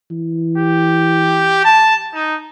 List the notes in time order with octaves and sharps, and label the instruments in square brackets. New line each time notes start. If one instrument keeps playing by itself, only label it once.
[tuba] E3
[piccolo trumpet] G4
A5
D#4